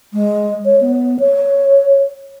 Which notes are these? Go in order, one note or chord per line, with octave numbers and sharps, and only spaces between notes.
G#3
C#5
B3
C#5